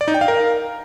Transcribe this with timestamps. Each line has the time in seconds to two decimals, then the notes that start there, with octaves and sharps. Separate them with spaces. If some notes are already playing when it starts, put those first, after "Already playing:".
0.01 D5
0.08 D#4
0.14 G5
0.21 F5
0.28 A#4